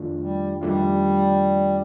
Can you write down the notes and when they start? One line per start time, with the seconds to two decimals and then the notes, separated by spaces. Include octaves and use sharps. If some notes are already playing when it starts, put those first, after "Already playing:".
Already playing: F2 D#3 A3 D4 F4
0.20 G3
0.61 F2 D#3 G3 A3 D4 F4